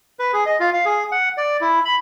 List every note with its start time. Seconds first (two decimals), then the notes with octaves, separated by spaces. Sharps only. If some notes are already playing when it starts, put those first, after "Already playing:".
0.19 B4
0.33 G#4
0.46 D#5
0.60 F4
0.73 F5
0.85 G#4
1.12 F#5
1.37 D5
1.61 E4
1.85 B5